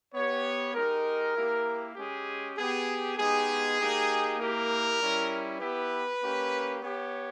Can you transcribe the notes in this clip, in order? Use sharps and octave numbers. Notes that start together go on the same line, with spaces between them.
B3 G4 C#5
G#3 D#4 G4 A#4
A#3 E4 G4
G#3 C#4 G4 G#4
B3 G4 G#4
G#3 B3 D#4 G4 G#4
A#3 D#4 G4
A#3 E4 G4 A#4
G3 C#4 E4
B3 E4 G4 B4
A#3 C#4 G4
B3 G4 C#5